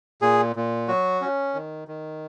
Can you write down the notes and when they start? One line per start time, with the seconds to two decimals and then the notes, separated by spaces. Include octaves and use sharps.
0.22 A#2 G#4
0.56 A#2
0.88 F#3 F#4
1.21 C#4
1.54 D#3
1.88 D#3